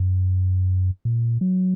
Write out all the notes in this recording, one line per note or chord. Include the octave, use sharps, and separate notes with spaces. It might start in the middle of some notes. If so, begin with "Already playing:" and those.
Already playing: F#2
A#2
F#3